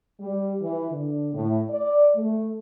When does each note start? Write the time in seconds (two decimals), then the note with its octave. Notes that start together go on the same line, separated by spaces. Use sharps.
0.20 G3
0.61 E3
0.91 D3
1.34 A2
1.69 D5
2.16 A3